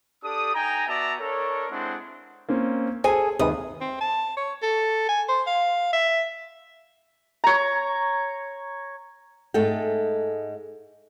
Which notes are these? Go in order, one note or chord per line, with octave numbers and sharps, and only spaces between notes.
D4 G4 A4 D#6
D#4 G5 G#5 A#5
B3 F#4 D5 E5 A5 A#5
D4 A4 A#4 C#5
G#3 C4 D4 E4 F#5 C6
A#3 C4 C#4
G#4 A4 C5 G#5
D#2 C3 G#3 B4 D#6
C4
A5
C#5
A4
G#5
C5
F5
E5
C#5 A#5
G#2 G#3 A3 A4 G5